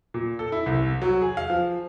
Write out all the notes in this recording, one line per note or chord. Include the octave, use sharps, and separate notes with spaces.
A#2
A4
E4
C2
F#3
G#4
F5
F3